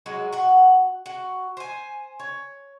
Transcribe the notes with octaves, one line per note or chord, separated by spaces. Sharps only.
F#3 G#3 F#4
F#4 F#5
F#4
C5 G#5
C#5